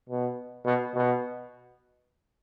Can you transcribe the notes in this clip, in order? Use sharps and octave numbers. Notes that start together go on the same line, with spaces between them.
B2
B2
B2